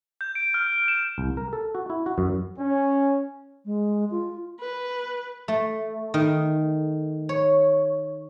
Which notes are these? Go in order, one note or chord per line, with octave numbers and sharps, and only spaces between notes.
G6
D7
F6
F6
E7
C2
A#4
A4
F#4
E4
F#4
F#2
C#4
G#3
F4
B4
A3
D#3
C#5